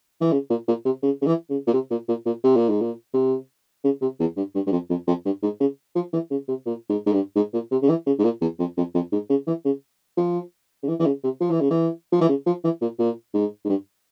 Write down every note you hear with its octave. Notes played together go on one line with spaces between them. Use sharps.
E3
C#3
A#2
A#2
C3
C#3
C#3
E3
C#3
A#2
C3
A#2
A#2
A#2
C3
A#2
G#2
A#2
C3
C#3
C3
E2
G2
G2
G2
F2
F2
F2
G2
G#2
C#3
F3
E3
C#3
C3
A#2
G#2
G#2
G2
G#2
A#2
C3
C#3
E3
C#3
G#2
A#2
E2
F2
F2
F2
G#2
C#3
E3
C#3
F3
C#3
E3
E3
C#3
C3
F3
E3
C#3
E3
F3
E3
C#3
F3
E3
A#2
A#2
G#2
G#2
G2